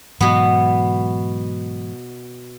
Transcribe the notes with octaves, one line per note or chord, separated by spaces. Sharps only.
G#2 B2 E3 F#3 B3